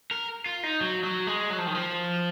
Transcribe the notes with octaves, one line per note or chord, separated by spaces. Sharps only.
A#4
F4
D#4
F#3
F#3
G#3
F#3
F3
D#3
F3